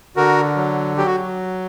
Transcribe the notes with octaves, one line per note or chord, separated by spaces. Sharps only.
D3 F#4 A#4
F#3
F#3 G4
F#4